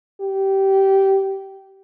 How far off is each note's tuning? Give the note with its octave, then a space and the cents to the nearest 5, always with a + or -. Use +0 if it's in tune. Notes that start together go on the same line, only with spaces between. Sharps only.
G4 -15